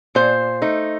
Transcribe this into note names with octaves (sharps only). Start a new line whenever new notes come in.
A#2 C5
A3 D#4